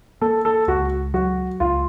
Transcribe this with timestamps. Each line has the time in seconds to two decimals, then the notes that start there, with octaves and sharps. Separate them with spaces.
0.21 A#3 A4
0.45 A4
0.68 C#2 F#4
1.14 F#3 F#4
1.60 C#2 F4